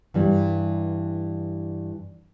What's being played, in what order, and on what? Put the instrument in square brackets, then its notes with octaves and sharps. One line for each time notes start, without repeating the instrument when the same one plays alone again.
[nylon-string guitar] G2 E3 G3